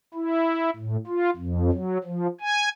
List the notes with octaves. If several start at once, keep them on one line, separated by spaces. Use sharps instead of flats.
E4
A2
F4
F2
F#3
F3
G#5